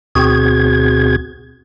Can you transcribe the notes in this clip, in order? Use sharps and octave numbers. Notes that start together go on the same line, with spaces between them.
D2 B2 C4 F#4 G#4 G#6